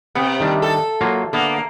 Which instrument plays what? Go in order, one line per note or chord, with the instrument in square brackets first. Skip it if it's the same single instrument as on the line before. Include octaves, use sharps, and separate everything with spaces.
[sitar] C3 [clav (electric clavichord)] B3 F#5
[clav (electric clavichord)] D#3 G3 D4
[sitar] A4
[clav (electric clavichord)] F#3 A#3 F4
[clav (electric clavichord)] D3 B3 E5 [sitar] A#3